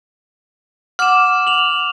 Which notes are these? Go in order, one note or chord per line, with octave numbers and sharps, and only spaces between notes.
F#5 D6 F6 E7
F7 F#7